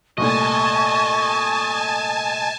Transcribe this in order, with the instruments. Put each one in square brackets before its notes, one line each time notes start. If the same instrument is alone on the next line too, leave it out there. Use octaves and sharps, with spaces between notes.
[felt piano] C2 A#2 A3 [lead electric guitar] D#5 [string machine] G#5 A5 [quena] C#6